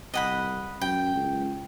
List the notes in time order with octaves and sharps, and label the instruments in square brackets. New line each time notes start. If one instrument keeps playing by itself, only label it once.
[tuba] C2 [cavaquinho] D#5 F#5 B5
[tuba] F#2 [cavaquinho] G5
[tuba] C#2